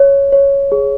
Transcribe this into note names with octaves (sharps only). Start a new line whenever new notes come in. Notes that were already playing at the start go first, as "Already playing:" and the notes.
Already playing: C#5
C#5
G#4